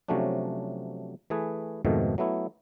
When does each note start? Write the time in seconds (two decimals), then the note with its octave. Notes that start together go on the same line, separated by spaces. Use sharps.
0.08 C3 F3 F#3 A3 C#4 D4
1.30 E3 A3 G#4 B4
1.85 F2 G#2 B2 D#3 F3 A3
2.18 F#3 A3 B3 E4